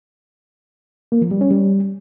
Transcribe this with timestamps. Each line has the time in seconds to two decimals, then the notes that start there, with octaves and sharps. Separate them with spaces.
1.12 A#3
1.22 F3
1.31 G3
1.41 C#4
1.51 G3